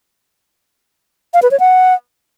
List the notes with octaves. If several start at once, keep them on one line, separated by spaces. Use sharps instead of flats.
F5
B4
C#5
F#5